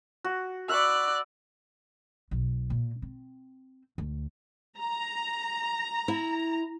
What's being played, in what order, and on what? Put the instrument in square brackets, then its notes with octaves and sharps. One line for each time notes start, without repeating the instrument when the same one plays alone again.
[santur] F#4
[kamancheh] D5 F#6 [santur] E5 B5 C#6
[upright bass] B1
A#2
C4
D2
[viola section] A#5
[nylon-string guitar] E4